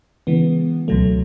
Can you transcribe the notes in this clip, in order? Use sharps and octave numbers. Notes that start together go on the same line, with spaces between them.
C#3 E3 G#3 B3
C#2 B2 F#3 A3